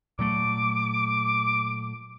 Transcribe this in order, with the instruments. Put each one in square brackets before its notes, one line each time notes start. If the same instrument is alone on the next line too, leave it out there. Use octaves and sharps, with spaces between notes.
[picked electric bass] A#2 F#3 A3 [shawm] D6